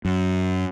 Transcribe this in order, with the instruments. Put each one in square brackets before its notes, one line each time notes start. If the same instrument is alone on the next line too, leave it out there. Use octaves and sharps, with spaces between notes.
[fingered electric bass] F#2